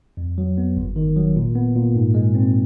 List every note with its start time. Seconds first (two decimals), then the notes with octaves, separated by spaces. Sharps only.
0.17 F2
0.38 F#3
0.58 B3
0.77 G1
0.96 D#3
1.16 F#3
1.36 A#2
1.55 B3
1.76 A#2
1.95 G#2
2.14 G#3
2.35 C4